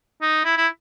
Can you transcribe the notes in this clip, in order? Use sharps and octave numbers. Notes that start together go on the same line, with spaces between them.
D#4
E4
E4